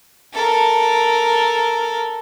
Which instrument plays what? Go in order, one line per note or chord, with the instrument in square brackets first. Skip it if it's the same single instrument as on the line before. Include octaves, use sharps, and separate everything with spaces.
[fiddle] A4 A#4